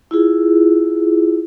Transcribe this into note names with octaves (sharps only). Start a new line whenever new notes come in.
E4 F4 G#4